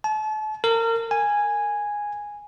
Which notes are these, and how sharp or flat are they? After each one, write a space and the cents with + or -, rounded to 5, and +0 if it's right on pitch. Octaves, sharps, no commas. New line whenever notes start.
A5 -35
A#4 -30
G#5 -5